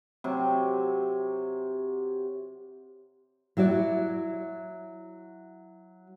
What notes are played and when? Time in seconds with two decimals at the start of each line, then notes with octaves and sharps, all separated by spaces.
0.24 C3 F#3
3.57 F#3 E4 F#4 D5